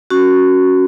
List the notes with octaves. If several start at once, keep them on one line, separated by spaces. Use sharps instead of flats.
C#4 F#4